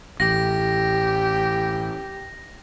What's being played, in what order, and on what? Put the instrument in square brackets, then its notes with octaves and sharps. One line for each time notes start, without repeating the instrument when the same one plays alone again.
[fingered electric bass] A1 [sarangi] G4 [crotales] A#6